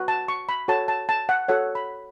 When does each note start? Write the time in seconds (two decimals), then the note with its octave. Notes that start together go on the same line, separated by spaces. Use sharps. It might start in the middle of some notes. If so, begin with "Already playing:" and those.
Already playing: F#4 B4
0.08 A5
0.28 C#6
0.49 B5
0.68 F#4 A4 C#5 A5
0.88 A5
1.09 A5
1.29 F#5
1.48 F#4 A4 C#5 F#5
1.75 B5